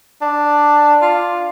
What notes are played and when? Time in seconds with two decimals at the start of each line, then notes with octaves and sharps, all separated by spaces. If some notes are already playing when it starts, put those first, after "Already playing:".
0.21 D4
1.02 F4